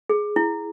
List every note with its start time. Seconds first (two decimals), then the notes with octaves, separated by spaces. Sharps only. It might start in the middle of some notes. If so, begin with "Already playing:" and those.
0.09 G#4
0.36 E4